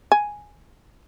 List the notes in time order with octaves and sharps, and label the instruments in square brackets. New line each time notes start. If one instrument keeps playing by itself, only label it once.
[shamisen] G#5